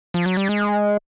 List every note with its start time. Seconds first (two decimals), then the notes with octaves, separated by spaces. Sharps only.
0.14 F3
0.26 F#3
0.37 G3
0.49 G#3